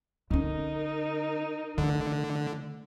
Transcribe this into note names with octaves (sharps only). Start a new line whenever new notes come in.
D3 C#4 D#4 A#4
D3 A3